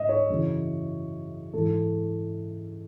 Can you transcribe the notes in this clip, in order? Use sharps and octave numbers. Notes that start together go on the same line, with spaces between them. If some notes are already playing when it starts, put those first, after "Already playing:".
Already playing: G#2 D#5 E5
C#5
F#2 C#3 E3
G#2 E3 A4